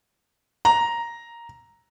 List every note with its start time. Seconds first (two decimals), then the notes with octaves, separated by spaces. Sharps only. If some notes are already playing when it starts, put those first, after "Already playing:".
0.65 A#5